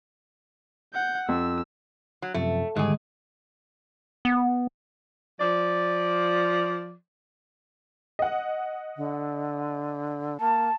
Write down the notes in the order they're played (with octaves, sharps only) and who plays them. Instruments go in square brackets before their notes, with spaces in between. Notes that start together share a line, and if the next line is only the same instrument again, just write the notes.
[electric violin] F#5 G6
[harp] F2 [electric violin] E6
[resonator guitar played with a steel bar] F#3
[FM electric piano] F#2 C3 F3 [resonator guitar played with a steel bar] A3
[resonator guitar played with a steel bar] E2 G#4 [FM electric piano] G#2 G3 [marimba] D3 D#3 [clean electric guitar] G#3
[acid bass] B3
[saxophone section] F3 D5
[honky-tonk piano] D#5 F#5
[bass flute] D3
[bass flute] A#3 [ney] A5